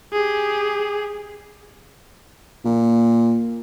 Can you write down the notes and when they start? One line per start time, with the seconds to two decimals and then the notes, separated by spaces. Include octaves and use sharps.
0.13 G4 G#4
2.65 A#2